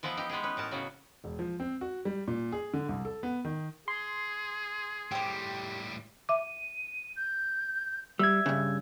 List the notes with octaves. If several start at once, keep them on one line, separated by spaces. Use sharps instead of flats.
E3 F3 B3 D#4 E4
E3 D#4 G4
G#3 B3 G4 G#4
C#4 B4
A2 A#4 A5
C#3 F#3 B3
E1
F3
C4
F#4
G3
A#2
G#4
D3
C2
A4
B3
D#3
G#4 C6
A2 G3 G4 C5
E5 D6 D#7
G6
G3 E5 E6 G#6
G2 C#3